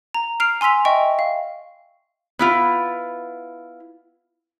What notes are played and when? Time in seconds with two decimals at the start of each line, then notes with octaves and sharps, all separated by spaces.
0.14 A#5
0.40 F6 C7 D7 F7
0.61 G#5 C6 E6 B6 F7
0.85 D#5 E5 G5 C#6
1.19 F5
2.39 B3 E4 F4